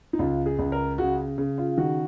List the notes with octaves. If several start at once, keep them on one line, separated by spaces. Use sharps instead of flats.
D#4
C#2 F4
G#4
C#2
A#4
C#3 F#4
C#3
F4
D#3 F#4